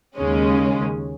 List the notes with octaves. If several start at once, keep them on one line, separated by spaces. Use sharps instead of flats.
D#2 C#3 G#3 C#4